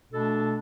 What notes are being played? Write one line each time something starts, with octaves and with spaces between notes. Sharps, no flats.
B2 A3 D4 A4